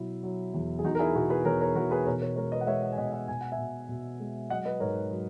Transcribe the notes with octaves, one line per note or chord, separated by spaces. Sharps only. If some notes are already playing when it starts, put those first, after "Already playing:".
Already playing: B2 F#3 E4
F#3
E2
G#4
E2 D#4 F#4
A#4
E4 G#4
B2 F#4 A#4
G#4 B4
E2 A#4 C#5
A#4 C#5
E2 F#4 A#4
G#4 B4
B2 A#4 C#5
A#4 C#5
G#3 A#4 C#5
B4 D#5
F#5
G#3 C#5 E5
D#5 F#5
G#5
B2 D#5 F#5
G#5
D#5 F#5
B2 G#5
F#5
E5 G#5
B2
B2
G#3
F#3 D#5 F#5
B4 D#5
G#2 A#4 C#5
F#3